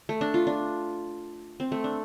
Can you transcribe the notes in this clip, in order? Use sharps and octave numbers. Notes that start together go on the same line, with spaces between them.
A3
D4
F4
D4
C4
A3
D4